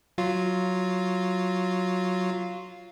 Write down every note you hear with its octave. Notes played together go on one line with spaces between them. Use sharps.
F#3 F4